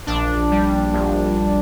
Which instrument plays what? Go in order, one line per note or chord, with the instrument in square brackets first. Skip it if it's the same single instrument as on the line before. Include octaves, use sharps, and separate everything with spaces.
[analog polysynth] A#1 D4
G3
A#1